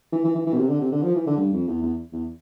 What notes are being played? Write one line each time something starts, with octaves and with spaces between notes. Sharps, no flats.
E3
E3
E3
E3
B2
C3
D3
C3
D3
F3
E3
D3
G2
F2
E2
E2
E2